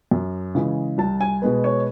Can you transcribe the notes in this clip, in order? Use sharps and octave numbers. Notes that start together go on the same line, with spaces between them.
F#2
C#3 E3 G#3
C2 A5
G#5
B2 G#3 B3
C#5